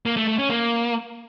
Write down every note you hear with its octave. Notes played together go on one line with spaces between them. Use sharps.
A#3
A3
A3
C#4
A#3